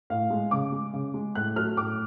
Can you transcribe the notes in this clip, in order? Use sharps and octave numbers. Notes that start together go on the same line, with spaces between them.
A2 F5
G#3
C#3 D6
G#3
C#3
G#3
A2 F#6
F#3 A3 F6
A2 D6